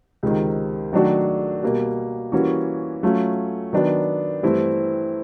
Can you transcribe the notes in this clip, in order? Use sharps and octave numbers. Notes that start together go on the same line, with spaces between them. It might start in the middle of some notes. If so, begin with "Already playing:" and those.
C#2 C3 D#3
D#3 F#3 A3 D4 F#4
B2 G3 A#3
E3 G3 A#3 C#4 F#4
F#3 A3 C#4 F4
D#3 F#3 B3 D4
G2 E3 A3 C4 E4